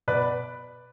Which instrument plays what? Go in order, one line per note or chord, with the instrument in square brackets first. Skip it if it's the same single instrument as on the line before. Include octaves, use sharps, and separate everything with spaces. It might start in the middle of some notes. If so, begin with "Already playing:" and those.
[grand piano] B2 B4 D5